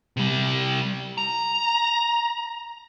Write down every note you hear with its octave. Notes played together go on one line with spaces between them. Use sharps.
C3 G3
A#5